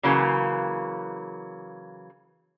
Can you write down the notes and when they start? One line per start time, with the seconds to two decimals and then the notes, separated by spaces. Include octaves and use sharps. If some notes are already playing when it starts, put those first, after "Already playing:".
0.03 C#3 E3 F#3 A#3